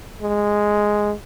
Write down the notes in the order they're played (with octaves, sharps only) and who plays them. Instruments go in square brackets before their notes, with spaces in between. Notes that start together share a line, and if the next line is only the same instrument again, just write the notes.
[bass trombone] G#3